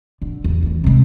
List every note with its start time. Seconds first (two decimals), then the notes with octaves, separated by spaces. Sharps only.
0.22 D3
0.44 E2
0.63 D2 E3
0.84 C3 G#3